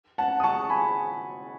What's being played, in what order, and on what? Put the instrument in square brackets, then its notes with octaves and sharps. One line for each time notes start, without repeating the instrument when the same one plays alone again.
[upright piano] F#5 A5
D#6
A5 C#6
G#5 B5